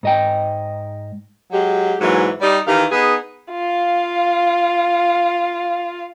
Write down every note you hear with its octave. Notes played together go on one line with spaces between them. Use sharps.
G#2 D#5 G5
F#3 G#3 G4
G#2 E3 F#3 A#3
G3 D#4 G4 D5
D#3 E3 G4 F5
B3 D#4 G#4
F4 F5